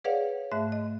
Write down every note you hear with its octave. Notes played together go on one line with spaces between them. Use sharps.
G#4 B4 C#5 D5 F5 F#5
G#2 A3 E5 F#6
D#5